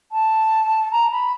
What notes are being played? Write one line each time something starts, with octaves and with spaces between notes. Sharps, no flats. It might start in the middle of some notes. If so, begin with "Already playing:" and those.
A5
A#5
B5